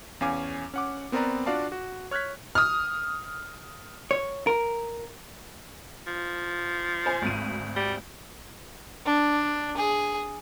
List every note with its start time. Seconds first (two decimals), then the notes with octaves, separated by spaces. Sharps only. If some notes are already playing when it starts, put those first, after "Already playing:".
0.21 E2 C#4 F5 G#5 D6
0.74 C#4 F#5 D6
1.12 B3 C4 A#4 B4 D5 A#5
1.46 D4 F4 F#4 D5 F5 A5
1.72 F#4
2.11 C#5 F6 F#6 G#6 B6
2.55 D#6 F6
4.11 C#5
4.47 A#4
6.07 F3
7.06 C5 G#5
7.22 G#1 D2 D#7
7.76 G3
9.06 D4
9.77 G#4